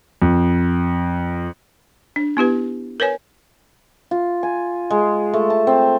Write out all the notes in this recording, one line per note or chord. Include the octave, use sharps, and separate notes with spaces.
F2
D4
B3 E4 G4 B4
A#4 B4 C#5 G#5
F4
G#5
G#3
A3
A5
C4